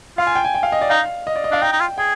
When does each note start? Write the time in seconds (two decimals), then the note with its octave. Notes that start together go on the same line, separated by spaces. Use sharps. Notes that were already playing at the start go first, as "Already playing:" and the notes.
0.18 F4 F5
0.27 G#5
0.36 G5
0.45 G#5
0.55 G5
0.63 F5
0.72 D#5
0.81 D5
0.90 D#4 F5
1.27 D#5
1.36 D5
1.44 D#5
1.52 D4 F5
1.62 D#4 G5
1.72 D#4
1.80 F4
1.98 G#4 G5